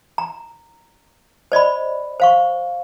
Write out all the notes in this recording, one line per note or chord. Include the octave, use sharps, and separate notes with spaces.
A#5
C5 D5 D#5 B5
C5 F5 C#6